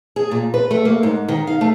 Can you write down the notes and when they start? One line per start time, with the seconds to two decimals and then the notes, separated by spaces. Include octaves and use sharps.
0.16 G#4
0.31 A#2
0.54 B4
0.71 A3
0.85 A#3
1.03 G#2
1.28 D#3
1.47 F5
1.61 A3